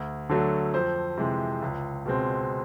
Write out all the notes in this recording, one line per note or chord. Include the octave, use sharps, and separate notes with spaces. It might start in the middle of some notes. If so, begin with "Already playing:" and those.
Already playing: D2
D3 F#3 A3
F2 C5
C3 E3 G#3
C#2
B2 G#3 C4